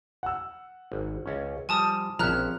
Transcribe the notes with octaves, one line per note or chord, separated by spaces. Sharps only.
F#5 E6
G#1
C#2 C#4
F3 G3 G#5 A5 D#6
A#1 F3 C4 C#4 E5 A#5 F6 F#6